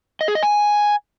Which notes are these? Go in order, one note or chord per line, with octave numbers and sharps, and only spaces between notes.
D#5
G#4
D#5
G#5